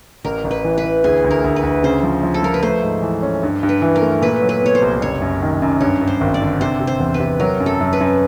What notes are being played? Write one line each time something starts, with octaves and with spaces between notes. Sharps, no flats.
A1 A#4
A1
B4
E3
B4
E3
D2 G#4
D2
A#4
D2
B4
D2
C#3 C5
F3
F3
A4
F3 A#4
B4
A3 C5
G#2
E3
C#4
G2
G2
B4
E3
A#4
A3
A#2 B4
F#3
B4
B3 C#5
C5
C2
F#1 C#5
F#2
D#3
F#2
G2 C#5
G2
C5
G#1
D5
D3
C3 C5
C3
C5
E2
B4
C3
F#3 A#4
F#2
A4
F#2
B4
F#2